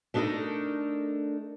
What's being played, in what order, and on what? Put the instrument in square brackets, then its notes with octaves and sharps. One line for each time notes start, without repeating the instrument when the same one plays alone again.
[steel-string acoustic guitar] A3 D4 D#4 F#4 A4 A#4